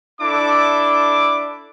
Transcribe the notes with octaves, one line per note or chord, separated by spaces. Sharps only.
D4 E4 A4 D6